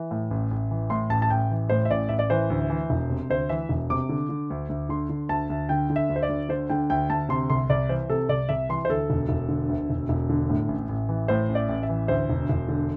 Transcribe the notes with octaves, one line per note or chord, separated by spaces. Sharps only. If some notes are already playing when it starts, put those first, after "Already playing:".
Already playing: E3
A2
A1
A1
E3
A2 C6
A1 A5
A5
A1 G5
E3
A2 C5
E5
A1 D5
A1 E5
D5
E3 C5
D2
E3
E1
C3
D2 C5
E3 E5
E1
C3 D6
D3
D3
D2
D2
D3 C6
D3
D2 A5
D2
D3 G5
D3
E5
D2
C5
D5
D2
D3 C5
D3 G5
D2 G5
D2 A5
C3 C6
C2 C6
C2 D5
E3 C5
C3 A4
C2 D5
C2 E5
E3 C6
C5
D2 A4
E1
E1
D3
D2
E1
E1
D3
A2
A1
A1
E3
A2 C5
A1
D5
A1
E5
E3
D2 C5
E1
E1
D3